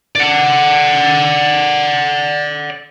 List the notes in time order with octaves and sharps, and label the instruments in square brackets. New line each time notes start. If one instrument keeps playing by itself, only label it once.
[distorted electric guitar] D5 F#5